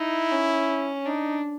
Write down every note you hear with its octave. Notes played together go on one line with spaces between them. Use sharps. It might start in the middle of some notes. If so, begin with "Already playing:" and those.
Already playing: D#4 E4
C#4
D4 D#4